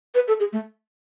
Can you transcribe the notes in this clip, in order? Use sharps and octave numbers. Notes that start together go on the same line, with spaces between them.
B4
A4
G#4
A3